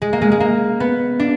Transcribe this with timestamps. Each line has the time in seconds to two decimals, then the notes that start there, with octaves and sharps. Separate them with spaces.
0.02 G#3
0.13 A#3
0.21 G#3
0.32 G#3
0.40 A#3
0.80 B3
1.20 D4